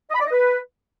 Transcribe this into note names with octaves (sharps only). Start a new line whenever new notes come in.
D#5
B5
D5
D#5
B4